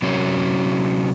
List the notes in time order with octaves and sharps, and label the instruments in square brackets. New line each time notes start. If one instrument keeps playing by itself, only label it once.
[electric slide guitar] C3 F#3 C#4